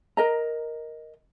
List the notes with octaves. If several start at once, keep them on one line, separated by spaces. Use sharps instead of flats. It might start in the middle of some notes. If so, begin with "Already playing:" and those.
A#4 D#5 A#5